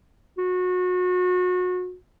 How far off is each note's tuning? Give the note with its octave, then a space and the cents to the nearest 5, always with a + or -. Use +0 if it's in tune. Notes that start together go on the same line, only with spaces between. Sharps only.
F#4 -30